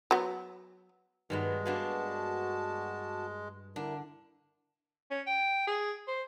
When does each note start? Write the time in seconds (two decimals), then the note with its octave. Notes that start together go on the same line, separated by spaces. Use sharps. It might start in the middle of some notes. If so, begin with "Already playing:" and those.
0.11 F#3 B3
1.30 G2 D#3 F#3 G#3 B3
1.66 A#3 B3 D4 F#4 A5
3.76 D3 D4 E4 A#4
5.11 C#4
5.27 G5
5.67 G#4
6.07 C5